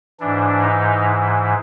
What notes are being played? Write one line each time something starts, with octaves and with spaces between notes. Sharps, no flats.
G#2 E3 D4
D#4